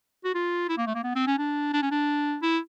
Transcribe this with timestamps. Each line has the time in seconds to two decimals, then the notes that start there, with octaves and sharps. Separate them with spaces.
0.25 F#4
0.35 F4
0.69 E4
0.78 A#3
0.87 A3
0.95 A#3
1.04 B3
1.15 C4
1.27 C#4
1.38 D4
1.73 D4
1.82 C#4
1.91 D4
2.42 E4